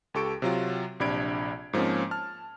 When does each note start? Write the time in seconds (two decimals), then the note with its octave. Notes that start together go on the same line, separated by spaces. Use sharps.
0.14 C#2 G4 A4 C#6 D7
0.42 C3 F#3 F4
1.00 A#1 C3 D4 B5 G#6 D7
1.73 G#2 F3 A#3 C4 C#4
2.11 A5 F6